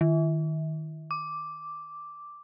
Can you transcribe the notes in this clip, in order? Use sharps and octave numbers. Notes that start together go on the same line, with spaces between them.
D#3
D6